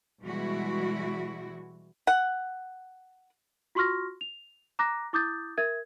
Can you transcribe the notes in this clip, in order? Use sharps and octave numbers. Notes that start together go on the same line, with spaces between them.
B2 E3 G3 G#3 E4 F#4
F#5
F4 F#4 C6 C#6 F6 A#6
F7
A#5 D6 F#6 A#6
E4 D6 D#6 G6 A6
A#4 E5 G#6